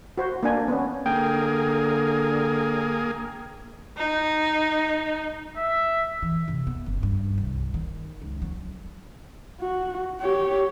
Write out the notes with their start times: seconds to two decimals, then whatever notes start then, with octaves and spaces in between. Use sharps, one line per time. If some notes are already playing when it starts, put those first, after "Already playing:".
0.18 F#4 C5
0.43 A#3 D4 G#5
0.68 B3 C#4
1.06 D3 A#3 G#4 G5
3.98 D#4
5.57 E5
6.22 E3
6.48 C3
6.67 B3
6.86 F#1
7.03 G2
7.38 C2
7.74 D#3
8.22 C#2
8.42 F#3
9.60 F#4
10.21 G4 C#5